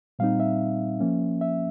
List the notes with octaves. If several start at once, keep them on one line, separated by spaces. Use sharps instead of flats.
A#2 G3 C4 D#4 F5
E5
F3 A#3 C#4
E5